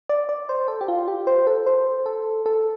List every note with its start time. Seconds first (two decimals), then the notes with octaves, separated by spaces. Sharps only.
0.09 D5
0.29 D5
0.49 C5
0.68 A4
0.81 G4
0.88 F4
1.08 G4
1.27 C5
1.47 A4
1.66 C5
2.06 A4
2.46 A4